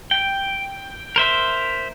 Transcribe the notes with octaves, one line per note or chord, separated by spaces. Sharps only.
G5
A#4 C5 E5